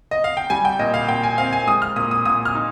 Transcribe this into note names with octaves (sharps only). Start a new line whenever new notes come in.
D#5
F5
G5
G3 G#5
G5
A#2 D#5
F5
A#2 G5
G#5
C4 F5
G#5
G#3 D#6
F6
A#2 D#6
D#6
A#2 D#6
F6
D#4